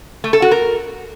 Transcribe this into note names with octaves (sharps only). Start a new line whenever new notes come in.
A3
A4
F#4
A#4